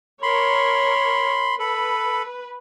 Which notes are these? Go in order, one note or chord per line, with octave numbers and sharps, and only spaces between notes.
A#4 C#5 B5 C6
A4 B4 B5